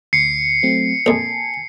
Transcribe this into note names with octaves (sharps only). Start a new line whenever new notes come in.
D2 C7 C#7
F#3 A3 C4
A#1 F2 G#5 A5